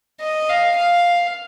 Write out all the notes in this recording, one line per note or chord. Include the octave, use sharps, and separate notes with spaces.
D#5
F5
F5